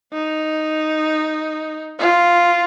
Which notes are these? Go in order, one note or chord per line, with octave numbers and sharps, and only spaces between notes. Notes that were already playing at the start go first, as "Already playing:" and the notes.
D#4
F4